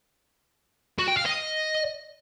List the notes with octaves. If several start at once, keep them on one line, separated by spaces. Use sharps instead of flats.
F#4
G5
F5
D#5